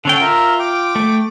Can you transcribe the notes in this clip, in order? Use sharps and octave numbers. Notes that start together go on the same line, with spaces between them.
D3 C#4 A4 F#5 G5
F4 A#4 E5
G5 D6
A3